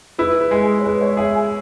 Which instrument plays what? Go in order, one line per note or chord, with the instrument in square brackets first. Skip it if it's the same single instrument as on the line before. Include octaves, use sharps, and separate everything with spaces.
[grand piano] E4 [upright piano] B4
[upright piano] B4
[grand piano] G#3
[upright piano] G#4
C#5
[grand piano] G#3 [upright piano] B4
[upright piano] C#5
[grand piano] G#4 [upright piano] E5
[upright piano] G#5